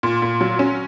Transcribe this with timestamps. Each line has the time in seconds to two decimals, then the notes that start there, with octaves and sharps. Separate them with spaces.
0.03 A#2
0.22 A#2
0.41 F#3
0.59 C#4